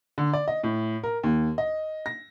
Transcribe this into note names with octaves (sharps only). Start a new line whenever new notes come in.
D3
D5
D#5
A2
A#4
D#2
D#5
A#6